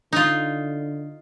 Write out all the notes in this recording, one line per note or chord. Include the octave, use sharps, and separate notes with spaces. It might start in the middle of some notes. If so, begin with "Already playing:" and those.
D3 D#4 F4